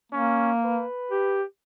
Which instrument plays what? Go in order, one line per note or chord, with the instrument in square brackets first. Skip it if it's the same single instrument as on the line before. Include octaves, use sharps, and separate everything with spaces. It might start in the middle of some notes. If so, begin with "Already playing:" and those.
[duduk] A#3 [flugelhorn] C#4
[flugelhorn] B4
[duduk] G4